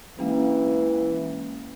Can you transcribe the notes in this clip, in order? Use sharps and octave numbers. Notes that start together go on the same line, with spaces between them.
E3 G#3 A#3 C#4